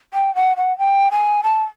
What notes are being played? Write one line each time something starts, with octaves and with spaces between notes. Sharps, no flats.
G5
F#5
F#5
G5
G#5
A5